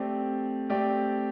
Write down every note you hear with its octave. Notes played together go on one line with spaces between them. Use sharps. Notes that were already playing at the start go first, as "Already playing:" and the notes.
Already playing: A3 C4 G4 D5
A3 C4 G4 D5